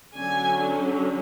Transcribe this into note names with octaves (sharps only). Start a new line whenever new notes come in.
D3 F#3 C#4 G#5